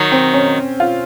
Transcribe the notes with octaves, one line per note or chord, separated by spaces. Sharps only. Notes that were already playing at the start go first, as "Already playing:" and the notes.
Already playing: D#3 F#3
C4
C#4
F4